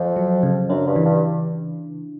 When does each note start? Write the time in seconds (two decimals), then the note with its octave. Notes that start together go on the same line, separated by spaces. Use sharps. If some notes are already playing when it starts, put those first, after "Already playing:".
Already playing: F2 F3
0.16 F#3
0.43 C#3
0.69 F#2 D4
0.87 G2
0.96 E3
1.05 G2